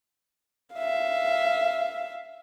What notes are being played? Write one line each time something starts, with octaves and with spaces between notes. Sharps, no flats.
E5 F5